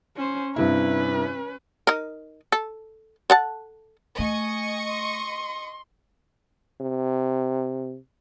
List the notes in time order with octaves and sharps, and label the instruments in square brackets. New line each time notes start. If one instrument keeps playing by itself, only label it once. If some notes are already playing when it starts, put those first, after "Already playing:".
[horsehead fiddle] C#4 C5
[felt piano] G2 C3 E4 [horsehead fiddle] C#4 B4
[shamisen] D#4 A#4
A4
A4 F#5 A5
[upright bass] A3 [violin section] D#5 C#6 [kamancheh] G#5
[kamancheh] C6
[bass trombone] C3